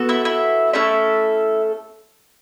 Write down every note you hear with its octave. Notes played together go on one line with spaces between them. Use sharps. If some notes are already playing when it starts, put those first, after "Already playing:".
Already playing: B3 F#4 A4
E4 E5
E4 E5
A3 C#4 E4 A4 E5